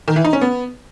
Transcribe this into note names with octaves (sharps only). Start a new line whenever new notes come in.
D#3
E3
D#4
C#4
B3